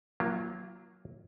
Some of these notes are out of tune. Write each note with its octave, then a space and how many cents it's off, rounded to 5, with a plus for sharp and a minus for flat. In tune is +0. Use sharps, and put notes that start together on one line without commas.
F#3 +0 A#3 +5 F4 -45